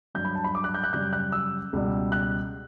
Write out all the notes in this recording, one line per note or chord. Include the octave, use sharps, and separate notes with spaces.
G2 F#3 G6
B5
A5
B5
D6
F#6
G6
F#6
F#2 C#3 G3 G6
F#6
E6
C#2 B2 G3
F#6